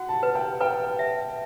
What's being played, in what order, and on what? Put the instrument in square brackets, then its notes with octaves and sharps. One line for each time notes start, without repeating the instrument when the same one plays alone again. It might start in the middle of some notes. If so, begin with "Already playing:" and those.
Already playing: [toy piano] F#4 [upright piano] F#5
[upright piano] A5
[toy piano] B4
[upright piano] G5
[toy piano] B4 [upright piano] G5
[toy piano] E5